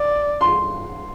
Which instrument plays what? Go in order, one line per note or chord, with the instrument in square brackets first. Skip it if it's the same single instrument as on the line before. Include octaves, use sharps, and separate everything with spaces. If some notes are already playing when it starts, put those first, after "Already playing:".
Already playing: [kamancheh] D5
[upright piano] C6